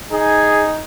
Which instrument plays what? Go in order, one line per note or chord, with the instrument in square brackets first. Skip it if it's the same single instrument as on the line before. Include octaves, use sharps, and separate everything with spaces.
[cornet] D#4 [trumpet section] G#4